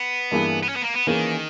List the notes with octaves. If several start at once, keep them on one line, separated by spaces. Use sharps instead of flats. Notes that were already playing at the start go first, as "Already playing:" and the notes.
Already playing: B3
G2 E3 A#3 E4 G#4
B3
C#4
B3
A#3
B3
D#3 E3 A#3 C#4 G#4